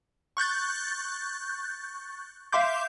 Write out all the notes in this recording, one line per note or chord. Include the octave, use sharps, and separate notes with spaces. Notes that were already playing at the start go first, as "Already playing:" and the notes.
C#6 F#6 G6 A6
E5 F5 C6 D6 G6